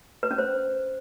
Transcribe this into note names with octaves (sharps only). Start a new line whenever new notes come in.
B4
C#4
C5